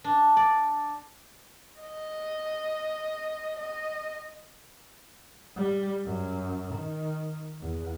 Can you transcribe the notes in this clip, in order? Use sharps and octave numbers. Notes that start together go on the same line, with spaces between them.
D4
D5
D#5
D#5
G3
F#2
D#3
E2